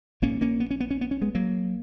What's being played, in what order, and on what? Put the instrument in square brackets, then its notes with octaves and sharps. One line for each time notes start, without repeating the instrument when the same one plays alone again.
[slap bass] A#1 G#2 A#3 C#4
A#3 C#4
B3
C#4
B3
C#4
B3
C#4
G#3 B3
F#3 A#3